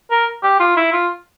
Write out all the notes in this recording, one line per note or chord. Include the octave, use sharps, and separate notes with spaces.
A#4
G4
F4
E4
F4